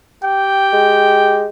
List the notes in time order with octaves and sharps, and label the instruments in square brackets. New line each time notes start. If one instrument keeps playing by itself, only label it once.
[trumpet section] G4 G5
[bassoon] G#3